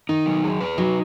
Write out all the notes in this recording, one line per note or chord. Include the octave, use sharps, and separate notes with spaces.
D#3 D#4
F#3
G#4
B4
F#3 D#4